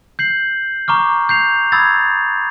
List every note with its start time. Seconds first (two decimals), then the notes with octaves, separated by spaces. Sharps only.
0.19 G6 C7 F#7
0.88 A#5 C#6 D6 F6
1.29 G6 C7 F7
1.72 B5 D#6 E6 G#6 A6